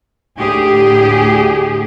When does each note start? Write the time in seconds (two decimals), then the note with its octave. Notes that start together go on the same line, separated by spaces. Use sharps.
0.39 D2 A2 G4 G#4